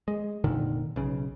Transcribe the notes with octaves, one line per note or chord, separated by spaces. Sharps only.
G#3
F1 A#2 D3 D#3
B1 C#3